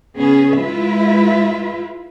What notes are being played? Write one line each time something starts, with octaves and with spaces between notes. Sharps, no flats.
C#3 B3 C#4 G#4
G#3 E4 F4 B4 E5